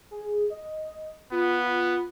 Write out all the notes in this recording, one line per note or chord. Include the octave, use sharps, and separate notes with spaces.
G#4
D#5
B3 F4